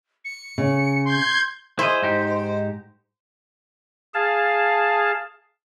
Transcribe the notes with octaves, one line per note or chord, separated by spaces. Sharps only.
C#7
C#3
C6 G6 G#6
E4 G#4 C5 D#5
G#2 D#4 G4
G#4 F5 A5